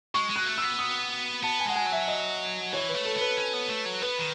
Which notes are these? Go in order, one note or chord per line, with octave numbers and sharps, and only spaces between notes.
G#3 C#6
G#3
F#6
A3
B3 E6
D#6
B3 A5
G#5
G#3 F#5
G#5
F#3
E5
D#5
E3 C#5
B4
A3
A4
B3
B4
C#4
B3
A3
F#3
B3 B4
D#3